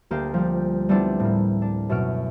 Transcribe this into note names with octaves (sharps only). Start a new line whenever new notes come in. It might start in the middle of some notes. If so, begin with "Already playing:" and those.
D2 A#3 G4 C7
F3 G3 G4
G3 A3 B3 C4 D4 E4
A2 A#3
D4
F#2 B2 E5 F6 D7